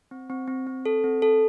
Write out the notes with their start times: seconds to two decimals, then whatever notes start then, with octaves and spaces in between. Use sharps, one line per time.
0.11 C4
0.30 C4
0.48 C4
0.67 C4
0.86 A4
1.04 C4
1.22 A4